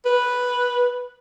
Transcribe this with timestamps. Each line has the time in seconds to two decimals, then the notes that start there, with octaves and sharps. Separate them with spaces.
0.06 B4